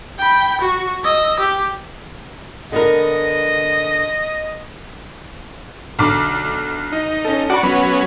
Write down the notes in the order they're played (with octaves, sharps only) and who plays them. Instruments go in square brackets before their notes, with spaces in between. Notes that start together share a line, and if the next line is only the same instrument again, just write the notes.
[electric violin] G5 B5
F#4
D#5 E6
G4
[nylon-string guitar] D3 B3 A#4 [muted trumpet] D#5
[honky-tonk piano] B1 D3 D6
[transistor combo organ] D#4
[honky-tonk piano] C#4 A4
[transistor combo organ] F#4 D5 [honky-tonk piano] F#5 B5
[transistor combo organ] F#3 B3 C#4